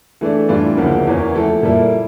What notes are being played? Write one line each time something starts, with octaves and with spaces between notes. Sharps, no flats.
E3 A3 D4
A2 E3 G3 D4 F4
D2 C#3 F3 A#3
E2 E3 A#3 C#4
F3 A3 E4 A4
A#2 G3 A#3 E4 A4